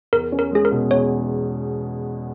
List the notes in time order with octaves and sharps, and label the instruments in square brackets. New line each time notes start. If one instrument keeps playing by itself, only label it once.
[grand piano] E2 [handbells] A#4
[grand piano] C#4
[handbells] A#4
[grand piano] G#3 [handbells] G#4
[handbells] A#4
[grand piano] B2
[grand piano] E2 [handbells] C#5